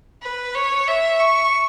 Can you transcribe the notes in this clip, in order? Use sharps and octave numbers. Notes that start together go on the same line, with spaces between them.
B4
C#5
E5
C#6